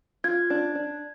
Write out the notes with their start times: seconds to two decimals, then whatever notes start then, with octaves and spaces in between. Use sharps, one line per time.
0.24 F4 G#6
0.50 D4
0.75 D4